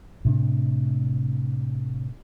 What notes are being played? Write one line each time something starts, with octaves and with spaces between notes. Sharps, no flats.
A2 C3 D4